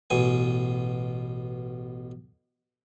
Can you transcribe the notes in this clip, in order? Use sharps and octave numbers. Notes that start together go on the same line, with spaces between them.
A1 B2 G#5